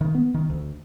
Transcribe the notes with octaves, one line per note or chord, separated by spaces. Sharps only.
D#3
B3
D#3
D2